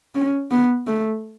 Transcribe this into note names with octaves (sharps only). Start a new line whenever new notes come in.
C#4
B3
A3